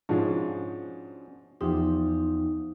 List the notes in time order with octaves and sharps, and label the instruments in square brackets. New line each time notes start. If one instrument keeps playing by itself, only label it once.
[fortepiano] G#2 F3 G#4 [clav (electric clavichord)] C#4 D4 F#4
[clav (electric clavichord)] E2 F3 C5 [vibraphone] D#4 [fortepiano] G4